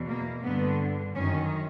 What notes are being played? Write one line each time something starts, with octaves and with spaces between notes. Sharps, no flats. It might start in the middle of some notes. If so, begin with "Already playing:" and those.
Already playing: E2 B2
A#3
G2 D3 B3
F#2 D#3 C#4